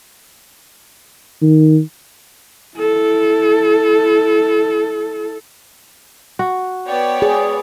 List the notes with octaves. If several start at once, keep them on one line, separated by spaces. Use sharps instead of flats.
D#3
E4 A4
F#4
B3 C#5 D5 G5
G#4